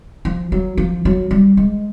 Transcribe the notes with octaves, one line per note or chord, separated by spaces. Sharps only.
F3
F#3
F3
F#3
G3
G#3